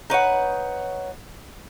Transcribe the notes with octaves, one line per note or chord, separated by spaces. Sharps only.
D#4 B4 C#5 F#5